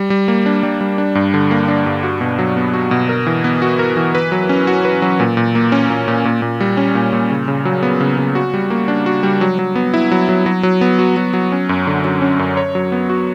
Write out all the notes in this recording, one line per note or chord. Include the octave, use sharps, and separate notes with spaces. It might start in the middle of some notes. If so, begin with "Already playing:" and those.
Already playing: G3
G3
A#3
D4
G3
G3
D4
G2
D3
A#3
D4
G2
F#4
B2
F#3
B3
F#4
B2
A#4
E3
B3
F#4
A#4
E3
B4
F#3
C#4
F#4
B4
F#3
A#2
A#2
A#3
C#4
A#2
A#2
A#2
A#2
G3
C#4
A#2
A#2
C#3
C#3
F#3
B3
C#3
C#3
F#4
G3
A#3
D4
F#4
G3
F#3
F#3
B3
E4
F#3
F#3
F#3
F#3
B3
F#4
F#3
F#3
C#4
F#2
D3
F#3
C#4
F#2
C#5
F#3
B3
F#4